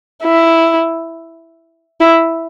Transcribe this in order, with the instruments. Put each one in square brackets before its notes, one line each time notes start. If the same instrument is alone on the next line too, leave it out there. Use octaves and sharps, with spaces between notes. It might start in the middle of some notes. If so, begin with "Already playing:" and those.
[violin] E4
E4